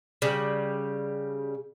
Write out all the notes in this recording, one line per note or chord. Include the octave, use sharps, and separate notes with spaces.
C#3 G3